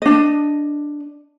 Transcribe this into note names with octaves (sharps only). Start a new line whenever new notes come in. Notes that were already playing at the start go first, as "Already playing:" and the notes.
D4 D#5